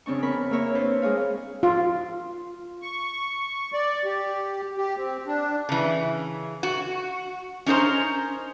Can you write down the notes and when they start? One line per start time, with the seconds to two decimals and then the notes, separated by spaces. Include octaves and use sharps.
0.06 F2 C#3 C4 D4 C#6
0.22 B3 A#4 B5 C#6
0.51 A#3 E4 A#4 C#5 E5
0.74 C4 D4 B4 C5
1.02 G#3 G#4 C#5 F5
1.63 F4
2.82 C#6
3.74 D5
4.05 G4
4.77 G4
4.96 C4
5.27 D4
5.69 C#3 E3
6.63 F#4
7.66 C#4 D#4 A#4 C5